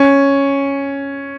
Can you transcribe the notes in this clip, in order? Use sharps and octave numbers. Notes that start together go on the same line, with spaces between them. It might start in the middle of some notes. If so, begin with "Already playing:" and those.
Already playing: C#4